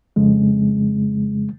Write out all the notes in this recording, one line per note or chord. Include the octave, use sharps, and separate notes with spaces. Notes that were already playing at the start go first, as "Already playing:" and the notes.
F2 C#3 G#3